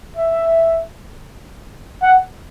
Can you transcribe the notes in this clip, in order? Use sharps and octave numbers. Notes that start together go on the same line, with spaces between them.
E5
F#5